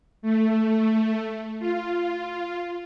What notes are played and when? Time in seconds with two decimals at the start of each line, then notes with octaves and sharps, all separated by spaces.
0.22 A3
1.60 F4